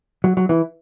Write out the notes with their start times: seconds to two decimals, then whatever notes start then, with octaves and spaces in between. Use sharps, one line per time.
0.24 F#3
0.37 F#3
0.49 E3